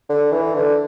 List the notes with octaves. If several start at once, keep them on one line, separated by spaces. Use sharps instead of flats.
D3
E3
D3